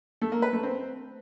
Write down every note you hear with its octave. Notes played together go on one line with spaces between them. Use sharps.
A3
A#3
B4
A3
C4